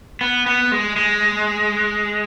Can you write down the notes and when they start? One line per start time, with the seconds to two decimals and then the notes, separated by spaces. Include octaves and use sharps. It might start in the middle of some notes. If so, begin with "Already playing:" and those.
0.21 B3
0.46 B3
0.72 G#3
0.96 G#3